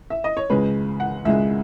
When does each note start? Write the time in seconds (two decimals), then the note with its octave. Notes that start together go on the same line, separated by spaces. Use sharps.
0.10 E5
0.24 D#5
0.37 C#5
0.50 C#2 C#3 G#3 B4
1.00 F#5
1.25 C#2 C#3 G#3 E5